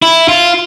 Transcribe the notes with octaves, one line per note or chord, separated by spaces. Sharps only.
E4
F4